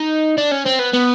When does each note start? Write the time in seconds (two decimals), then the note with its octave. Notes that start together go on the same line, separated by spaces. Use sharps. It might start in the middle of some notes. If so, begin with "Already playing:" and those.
Already playing: D#4
0.38 D4
0.51 C#4
0.65 C4
0.79 B3
0.93 B3